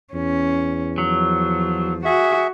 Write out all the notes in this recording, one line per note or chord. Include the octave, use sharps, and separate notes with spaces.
E2 C#4
F3 F#3
F#4 G#4 E5